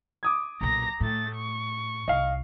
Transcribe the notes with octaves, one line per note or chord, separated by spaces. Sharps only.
D6 D#6 G#6
B1 A#2 A#5 A#6
A2 A3 A6
C#6
C2 D#5 F5